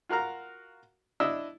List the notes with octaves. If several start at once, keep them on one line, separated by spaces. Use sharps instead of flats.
F4 F#4 A#4 F5 A#5
D4 E4 D#5 E6